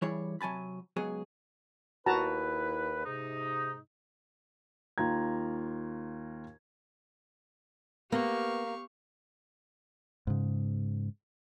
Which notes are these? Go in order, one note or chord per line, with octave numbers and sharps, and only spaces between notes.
E3 G3 E4 G#4 C#5
C3 F#3 G#5 A5 B5
C#2 F#3 B3 G#4
D#2 E4 F#4 B4 A5 A#5
G#2 C3 D#4
D#2 F4 A#5 G#6
A#3 B3 G4 F5 C#6
G#2 C#3